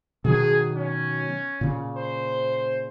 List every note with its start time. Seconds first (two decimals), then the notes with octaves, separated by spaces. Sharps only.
0.25 B2 D#3 F#3 G#4
0.75 C#4
1.61 A#2 C#3
1.97 C5